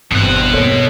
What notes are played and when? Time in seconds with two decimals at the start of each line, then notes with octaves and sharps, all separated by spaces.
0.11 G1 E2 G2 B2 C4 F#5
0.53 A#3 A4 C#5